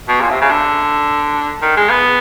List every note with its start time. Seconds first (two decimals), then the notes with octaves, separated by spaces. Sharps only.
0.08 B2
0.21 A#2
0.31 C3
0.41 C#3
0.50 D3
1.62 D#3
1.77 G#3
1.90 B3